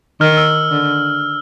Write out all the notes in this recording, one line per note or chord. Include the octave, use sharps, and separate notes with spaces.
D#3 F6
E6
D3